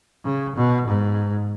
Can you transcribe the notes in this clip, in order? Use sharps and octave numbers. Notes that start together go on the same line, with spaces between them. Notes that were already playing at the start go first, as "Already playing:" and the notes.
C#3
B2
G#2